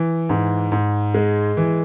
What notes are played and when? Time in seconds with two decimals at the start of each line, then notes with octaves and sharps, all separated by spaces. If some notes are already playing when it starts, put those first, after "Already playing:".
Already playing: E3
0.29 G#2
0.72 G#2
1.14 G#3
1.57 E3